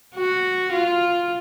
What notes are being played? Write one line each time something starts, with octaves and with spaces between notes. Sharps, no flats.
F#4
F4